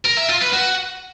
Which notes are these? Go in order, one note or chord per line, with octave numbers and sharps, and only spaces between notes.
A#4
E5
F4
B4
F#4